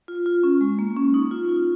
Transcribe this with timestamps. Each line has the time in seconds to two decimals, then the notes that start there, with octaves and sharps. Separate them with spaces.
0.08 F4
0.26 F4
0.43 C#4
0.61 G#3
0.79 A#3
0.97 C#4
1.14 D#4
1.31 F4
1.49 F4